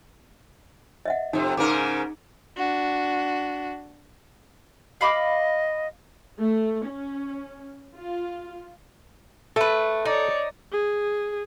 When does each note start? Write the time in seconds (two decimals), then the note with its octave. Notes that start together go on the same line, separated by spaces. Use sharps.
1.06 D#5 E5 F#5
1.33 F2 C3 D#4
1.57 G#2 C#3 D#4 G#4 A#4 D6
2.57 D4 F#4
5.01 D#5 F5 B5 D6
6.39 A3
6.86 C#4
7.95 F4
9.56 A3 A4 B4
10.05 D#4 C#5 D5
10.72 G#4